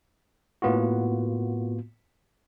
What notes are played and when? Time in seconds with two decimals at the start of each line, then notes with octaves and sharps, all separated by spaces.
0.62 A2 A#3 B3 F4 F#4